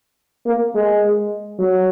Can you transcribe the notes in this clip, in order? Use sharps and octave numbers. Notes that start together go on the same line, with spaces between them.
A#3
G#3
F#3